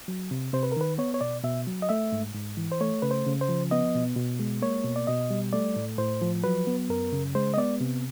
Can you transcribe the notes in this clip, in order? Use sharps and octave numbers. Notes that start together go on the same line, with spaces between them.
F#3
C3
C3 C5
B4
A#4
D#3 B4
B3 C#5
C#5
B2 D5
B2 E5
F#3
D#5
A3 E5
G#2
G#2
E3
C5
A3 C#5
C#3 B4
C5
C#3
C5
F3
B3 D#5
B2
B2
G#3
A#3 C#5
B2
D5
B2 D#5
G3
A3 D5
A2
A2 C5
F3
F#3 B4
B3
F#2 A#4
C#3
G#3 C5
D#5
B3 D5
C3